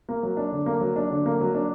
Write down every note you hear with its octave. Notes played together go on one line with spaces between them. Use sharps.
A#3
F#3
D4
D3
A#3
F#3
D4
D3
A#3
F#3
D4